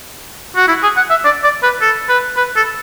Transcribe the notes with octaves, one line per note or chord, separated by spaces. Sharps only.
F#4
E4
G#4
F#5
E5
D5
D5
B4
A4
B4
B4
A4